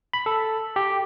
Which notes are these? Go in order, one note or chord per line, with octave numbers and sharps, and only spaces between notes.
B5
A4
G4